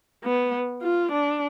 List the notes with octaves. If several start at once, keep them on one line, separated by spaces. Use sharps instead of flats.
B3
F4
D4